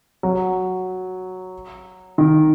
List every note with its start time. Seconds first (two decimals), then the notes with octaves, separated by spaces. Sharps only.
0.23 F#3
2.18 D#3